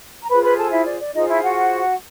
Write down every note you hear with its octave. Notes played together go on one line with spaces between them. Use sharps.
A#5
F4 G#4 B4 C5 B5
B4 B5
A4 A5
E4 E5
D5
D5
D#4 F4 G#4 C5 D#5
E4 E5
F#4 F#5